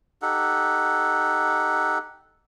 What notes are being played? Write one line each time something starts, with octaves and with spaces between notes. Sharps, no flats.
D#4 G4 A4 F#5